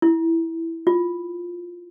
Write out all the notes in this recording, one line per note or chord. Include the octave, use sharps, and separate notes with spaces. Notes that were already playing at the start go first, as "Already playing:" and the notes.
E4
F4